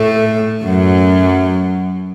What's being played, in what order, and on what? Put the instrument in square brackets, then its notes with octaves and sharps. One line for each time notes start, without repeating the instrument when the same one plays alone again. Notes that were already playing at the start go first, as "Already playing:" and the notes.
Already playing: [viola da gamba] A2 A3
F#2 F#3